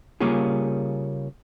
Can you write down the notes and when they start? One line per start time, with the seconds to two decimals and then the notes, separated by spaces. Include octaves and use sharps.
0.20 C#3 G3 A#3 C#4 F4 G#4